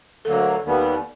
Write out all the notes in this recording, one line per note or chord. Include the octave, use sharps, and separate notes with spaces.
D2 D3 F#3 A#3 A4
D#2 D#3 G3 B3